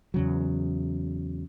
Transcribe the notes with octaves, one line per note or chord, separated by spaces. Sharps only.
E2 C#3 F#3